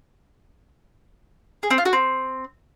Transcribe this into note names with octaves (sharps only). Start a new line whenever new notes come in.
G#4
C4
F4
F#4
C4